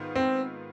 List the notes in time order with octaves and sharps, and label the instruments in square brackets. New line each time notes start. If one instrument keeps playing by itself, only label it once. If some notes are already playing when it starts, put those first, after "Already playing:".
Already playing: [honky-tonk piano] G#2 D#3 B3 F4
[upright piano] C4